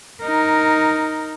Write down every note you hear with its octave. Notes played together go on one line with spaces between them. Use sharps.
D#4 A#4